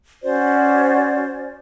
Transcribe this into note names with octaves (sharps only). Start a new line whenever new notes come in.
C#4 F#4 C5 D5